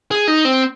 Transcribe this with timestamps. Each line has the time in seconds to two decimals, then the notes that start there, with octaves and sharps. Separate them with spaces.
0.11 G#4
0.28 D#4
0.45 C4